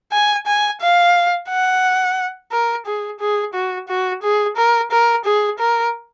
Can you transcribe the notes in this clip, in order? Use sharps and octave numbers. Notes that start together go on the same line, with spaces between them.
G#5
G#5
F5
F#5
A#4
G#4
G#4
F#4
F#4
G#4
A#4
A#4
G#4
A#4